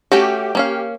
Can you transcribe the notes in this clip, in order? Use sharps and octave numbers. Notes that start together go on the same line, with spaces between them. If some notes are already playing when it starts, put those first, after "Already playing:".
A3 C#4 F#4 G4
A#3 C#4 F5